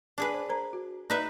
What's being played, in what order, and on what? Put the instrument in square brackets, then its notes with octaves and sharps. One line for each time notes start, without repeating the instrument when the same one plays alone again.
[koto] D4 G#4 B4
[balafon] C5
A#4 C5 A#5
F#4
[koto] D#4 B4 E5 [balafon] D5